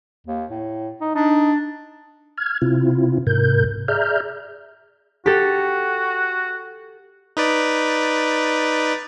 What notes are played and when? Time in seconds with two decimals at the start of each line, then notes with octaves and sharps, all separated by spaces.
0.27 D#2
0.51 A2
1.01 D#4
1.15 D4 D#4
2.38 F6 G#6
2.62 C3 C4 E4 F4
3.27 G#2 C3 A#4 G6
3.88 G#4 D5 E5 A#5 F6 G6
5.26 F#4 G4 A4
7.37 D#4 B4 D5